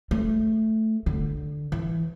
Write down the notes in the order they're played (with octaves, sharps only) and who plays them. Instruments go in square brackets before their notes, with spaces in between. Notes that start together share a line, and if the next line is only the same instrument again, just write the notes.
[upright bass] A3
D3
E3